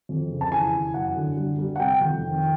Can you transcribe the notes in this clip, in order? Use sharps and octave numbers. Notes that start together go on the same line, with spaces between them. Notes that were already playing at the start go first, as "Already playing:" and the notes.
F2
C#3
A5
E3 G#5
E3
F#2 F#5
D3
G3
G3
F#5
C3 G5
F2
D#3